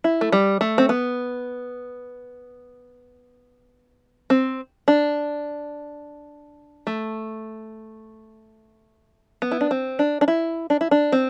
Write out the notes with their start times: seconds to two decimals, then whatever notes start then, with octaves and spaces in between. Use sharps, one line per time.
0.04 E4
0.21 A3
0.32 G3
0.61 A3
0.78 C4
0.89 B3
4.30 C4
4.88 D4
6.87 A3
9.42 B3
9.52 E4
9.61 D4
9.71 C4
9.99 D4
10.21 D4
10.28 E4
10.70 D4
10.81 E4
10.91 D4
11.12 C4